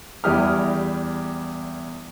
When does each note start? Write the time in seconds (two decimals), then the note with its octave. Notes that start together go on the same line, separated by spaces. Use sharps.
0.24 E2 G3 E4 G4 D#6 F6